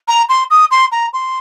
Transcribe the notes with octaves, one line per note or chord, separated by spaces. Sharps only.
A#5
C6
D#6
C6
A#5
C6